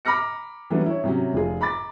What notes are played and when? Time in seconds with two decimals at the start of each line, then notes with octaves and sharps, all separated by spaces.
0.05 A#5 B5 D6 F6 A#6 C#7
0.70 E3 F#3 G3 A3 B3 D4
0.86 E4 C#5
1.04 C3 F#3 C#4
1.33 F1 F4 G#4
1.61 A#5 B5 D6 A6